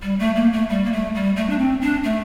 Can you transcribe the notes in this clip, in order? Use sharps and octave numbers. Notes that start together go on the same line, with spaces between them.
G3
A3
A#3
A3
G3
A#3
A3
G3
A3
D4
C4
D4
A3